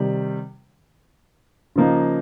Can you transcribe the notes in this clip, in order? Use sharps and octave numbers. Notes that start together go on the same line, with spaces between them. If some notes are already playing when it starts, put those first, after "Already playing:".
Already playing: C3 D#3 G3
C#3 F3 A#3 D#4